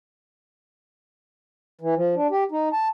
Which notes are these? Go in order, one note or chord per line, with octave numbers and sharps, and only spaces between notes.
E3
F3
D4
G4
D#4
A5